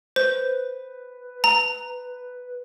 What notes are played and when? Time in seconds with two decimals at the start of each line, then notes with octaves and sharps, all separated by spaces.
0.16 B4 C5
1.44 A#5